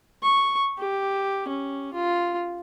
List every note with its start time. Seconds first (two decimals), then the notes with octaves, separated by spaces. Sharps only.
0.22 C#6
0.78 G4
1.48 C#4
1.93 F4